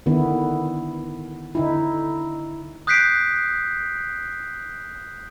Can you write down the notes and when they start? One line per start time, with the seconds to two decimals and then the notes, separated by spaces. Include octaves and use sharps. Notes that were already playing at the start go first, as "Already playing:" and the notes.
0.06 D3 D#3 B3 E4
1.55 D3 D#4 E4
2.87 D#6 F#6 G6 B6 C7 D7